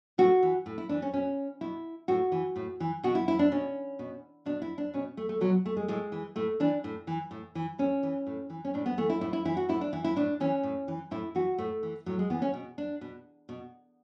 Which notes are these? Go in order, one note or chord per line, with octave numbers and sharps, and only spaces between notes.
A2 F#4
E3
A2
E4
E3 D4
C#4
B2 C#4
B2 E4
A2 F#4
E3
A2
E3
B2 F#4
E4
E4
D4
B2 C#4
B2
B2 D4
E4
D4
B2 C#4
A3
A3
B2 F#3
A3
G#3
A2 G#3
E3
A2 A3
E3 D4
A2
E3
A2
E3
A2 C#4
E3
A2
E3
C#4
A2 D4
B3
E3 A3
E4
A2 E4
E4
E3 E4
F#4
A2 E4
D4
E3 E4
E4
A2 D4
E3 C#4
A2
E3
A2 E4
E3 F#4
A2 A3
E3
A2 F#3
G#3
E3 B3
C#4
B2
D4
B2
B2